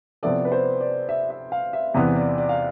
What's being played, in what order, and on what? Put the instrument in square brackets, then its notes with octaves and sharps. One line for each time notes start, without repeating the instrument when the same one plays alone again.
[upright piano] C3 F3 B3 E4 A4 [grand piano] D5
[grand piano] B4
C5
D5
E5
E5
F5
E5
[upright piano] E2 C3 E3 B3 [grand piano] D5
[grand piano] D5
D5
F5